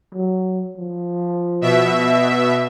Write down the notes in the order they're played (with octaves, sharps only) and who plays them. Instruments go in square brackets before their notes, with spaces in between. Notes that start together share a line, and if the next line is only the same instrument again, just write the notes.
[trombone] F#3
F3
[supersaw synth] B2 E5